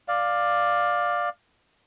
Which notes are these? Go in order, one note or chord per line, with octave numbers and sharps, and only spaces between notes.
D5 F5